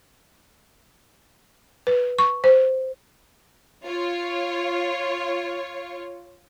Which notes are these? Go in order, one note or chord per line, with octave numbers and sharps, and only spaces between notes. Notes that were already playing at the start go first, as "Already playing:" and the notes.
B4
C#6
C5
F4 C#5